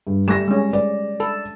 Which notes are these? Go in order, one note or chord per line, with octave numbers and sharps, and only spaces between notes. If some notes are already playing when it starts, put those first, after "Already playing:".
G2
G3 A3 A#6 E7
G#3 C#4
D5
A4